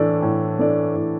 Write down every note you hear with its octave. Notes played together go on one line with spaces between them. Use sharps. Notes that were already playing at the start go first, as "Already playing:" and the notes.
Already playing: A2 E3 D4 A4 D5
A2
E3 D4 A4 D5
A2